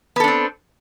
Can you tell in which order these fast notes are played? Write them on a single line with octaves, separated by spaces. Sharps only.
B3 A4 D4 C4